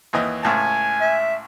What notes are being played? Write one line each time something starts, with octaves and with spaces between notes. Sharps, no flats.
D#2 E3 D#5
C#2 A2 G#5 A5
E5